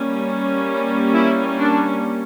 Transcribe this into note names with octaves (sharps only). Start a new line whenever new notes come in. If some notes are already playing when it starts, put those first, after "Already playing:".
Already playing: G3 A#3 C#4
E4
D4